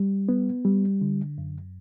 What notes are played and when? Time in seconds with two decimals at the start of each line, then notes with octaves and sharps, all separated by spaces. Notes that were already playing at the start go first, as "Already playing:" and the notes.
Already playing: G3
0.29 B3
0.65 G3
1.01 D3
1.38 F#2